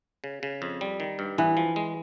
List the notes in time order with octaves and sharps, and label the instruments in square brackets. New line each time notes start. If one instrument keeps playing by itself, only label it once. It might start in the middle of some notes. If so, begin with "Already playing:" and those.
[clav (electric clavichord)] C#3
C#3
F2
G3
D#3
G2
[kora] E3 [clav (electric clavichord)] B3
[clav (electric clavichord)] F3
G#3